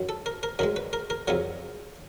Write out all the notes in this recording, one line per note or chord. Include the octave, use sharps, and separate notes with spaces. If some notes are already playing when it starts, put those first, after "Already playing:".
Already playing: F#2 D#3 F#3
A4
A#4
A#4
F#2 D#3 G#3 A#4
B4
A#4
A#4
F2 C#3 F#3 A#4